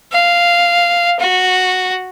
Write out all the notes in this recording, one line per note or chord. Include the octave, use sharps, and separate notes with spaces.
F5
F#4